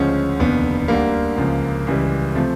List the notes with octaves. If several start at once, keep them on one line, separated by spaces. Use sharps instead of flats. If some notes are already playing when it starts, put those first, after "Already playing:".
Already playing: D2 C#3 F3 G#3 C#4
F1 D#2 D3 B3
D2 D3 G3 A#3
C#2 C#3 F3
C#2 C#3 E3 G3
C3 F3 A3